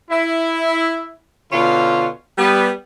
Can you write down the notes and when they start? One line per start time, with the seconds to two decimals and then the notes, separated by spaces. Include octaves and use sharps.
0.10 E4
1.52 B2 D3 C#4 F4
2.38 G3 B3